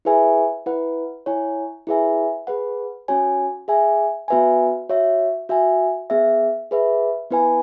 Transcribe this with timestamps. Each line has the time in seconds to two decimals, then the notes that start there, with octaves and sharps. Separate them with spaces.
0.05 E4 G#4 B4 E5 G#5
0.66 E4 B4 F#5
1.26 E4 C#5 G#5
1.87 E4 G#4 B4 E5 G#5
2.47 G#4 B4 F#5
3.08 C#4 F#4 C#5 G#5
3.68 G#4 E5 G#5
4.28 B3 F#4 B4 E5 G#5
4.89 F#4 C#5 E5
5.49 F#4 E5 G#5
6.10 B3 G#4 E5
6.71 G#4 B4 E5
7.31 B3 E4 B4 G#5